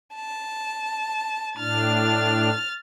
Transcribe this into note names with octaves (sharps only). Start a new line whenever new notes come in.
A5
A2 D4 F6 A6